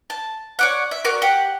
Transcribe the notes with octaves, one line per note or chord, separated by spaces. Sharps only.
A5
C#5 D5 F#5
E5
F#4 A#4 D5
G4 F#5